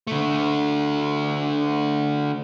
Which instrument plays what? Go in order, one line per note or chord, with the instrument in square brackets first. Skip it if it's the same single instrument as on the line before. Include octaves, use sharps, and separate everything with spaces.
[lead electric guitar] D3 A3